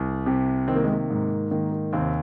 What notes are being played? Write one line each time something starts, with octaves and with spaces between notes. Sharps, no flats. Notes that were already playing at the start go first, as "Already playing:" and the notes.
Already playing: C2
C3
D#3 C4
A#3
G#3
A#3
G#2
D#3 A#3
A#3
D#2 C3 C4